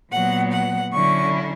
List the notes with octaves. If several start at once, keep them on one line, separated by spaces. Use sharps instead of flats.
A#2 F#3 B3 F#5
F#5
D3 F#3 C#4 E4 C#6